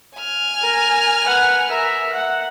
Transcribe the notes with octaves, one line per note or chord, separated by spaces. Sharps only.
G#5 F6
A#4
B4 F#5
A#4 E5
F#5